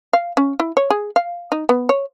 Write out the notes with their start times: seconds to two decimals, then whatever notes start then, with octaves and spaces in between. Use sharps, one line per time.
0.13 F5
0.37 C#4
0.60 E4
0.77 C#5
0.90 G#4
1.16 F5
1.52 D#4
1.69 B3
1.89 C#5